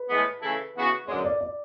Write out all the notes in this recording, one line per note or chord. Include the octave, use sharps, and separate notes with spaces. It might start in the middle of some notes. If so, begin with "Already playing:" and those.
Already playing: B4
A2 E3 G#3 B3
C#3 E3 A3 E4 A4
C#3 E3 B3 F#4
F#2 D3 G#3 C#5
D5
D5